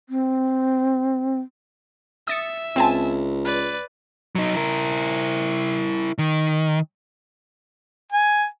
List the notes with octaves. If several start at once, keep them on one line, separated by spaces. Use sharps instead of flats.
C4
E5 D#6 A6 C#7
C#2 C4 G#5 A5
B4 D5
F#3 D#4
E4 A#4
D#3
G#5